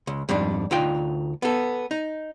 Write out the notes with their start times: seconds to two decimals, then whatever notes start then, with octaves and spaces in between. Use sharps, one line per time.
0.07 C#2
0.29 F2 G#2 G3 D4
0.71 D2 D#4 F4 G5
1.42 B3 A4
1.91 D#4